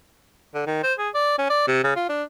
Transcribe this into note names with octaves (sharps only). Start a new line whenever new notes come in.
D3
D#3
C5
G#4
D5
C#4
D5
C3
C#3
F4
D4